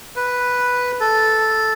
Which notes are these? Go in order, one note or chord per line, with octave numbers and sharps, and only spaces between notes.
B4
A4